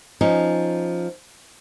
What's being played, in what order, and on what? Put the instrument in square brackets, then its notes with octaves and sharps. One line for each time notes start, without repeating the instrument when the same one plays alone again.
[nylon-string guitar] F3 C#4 D#4